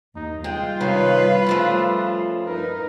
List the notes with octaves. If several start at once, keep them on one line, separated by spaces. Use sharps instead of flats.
D#2 D#4
G3 G#3 F4 F5 G5
C3 D#3 C#4 B4
C#3 F3 A3
D#4 A#4 B4